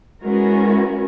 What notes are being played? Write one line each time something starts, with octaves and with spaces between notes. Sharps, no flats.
G#3 B3 C#4 E4 F#4 A#4